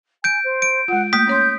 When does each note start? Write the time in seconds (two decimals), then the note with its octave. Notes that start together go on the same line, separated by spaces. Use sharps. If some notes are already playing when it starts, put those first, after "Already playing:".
0.24 G#5 G6 D7
0.44 C5
0.62 D7
0.88 G#3 F4 F#5
1.13 A3 A#3 D#6 G6 B6
1.27 C#4 C#5 C6